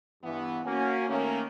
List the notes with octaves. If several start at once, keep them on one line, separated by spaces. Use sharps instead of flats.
G2 E3 B3
A#3 C#4 F#4 G#5
D#3 A3 A#3 C#4